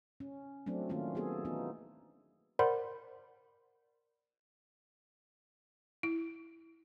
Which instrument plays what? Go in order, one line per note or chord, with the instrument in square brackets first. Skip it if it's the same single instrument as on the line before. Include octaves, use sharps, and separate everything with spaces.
[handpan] C#4
F#3 A3 C4 D4
D#3 A3 A#3 C#4 F4
A#3 B3 F#4 G#4 A4
E3 B3 D#4 F4
[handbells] A#4 C5 D5 F#5 B5 C6
[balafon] E4